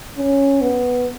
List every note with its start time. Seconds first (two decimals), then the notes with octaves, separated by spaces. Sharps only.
0.18 C#4
0.61 B3